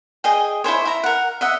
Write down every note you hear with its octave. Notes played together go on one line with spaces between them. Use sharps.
G#4 D#5 G5
E4 A4 C5 C#5
E4 A#5
A#4 F#5
D#5 E5 F#5